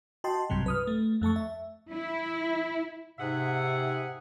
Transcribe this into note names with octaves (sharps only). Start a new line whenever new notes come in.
F#4 D#5 G5 A5 C6
B1 G2 C3 F#3
B4 D#6 F6
A3
F2 A3 A5 C#6
E5
E4
G#2 C3 G#4 E5 F#5